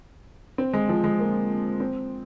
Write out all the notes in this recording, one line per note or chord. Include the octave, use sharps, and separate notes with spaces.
C4
G#3
F3
G#3
A#3
C4